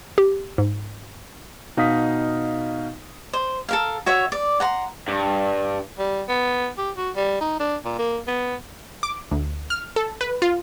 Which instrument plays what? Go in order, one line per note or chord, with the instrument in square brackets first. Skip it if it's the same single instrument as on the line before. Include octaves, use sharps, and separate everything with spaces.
[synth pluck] G4
G#2
[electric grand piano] B2 D#4 D#5 F5 D#6 B6
[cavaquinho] C5
A4 A#4 F5
F#4 C#5 E5
D5
F#5 A#5 C6
[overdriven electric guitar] G2
[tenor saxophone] G3
B3
G4
F#4
G3
D#4
D4
A#2
A#3
B3
[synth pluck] D6
D2
F6
A4
B4
F4